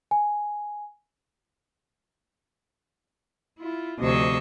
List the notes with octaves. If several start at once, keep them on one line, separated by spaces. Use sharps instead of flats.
G#5
E4 F4
D2 C3 F3 D#5 C#6 E6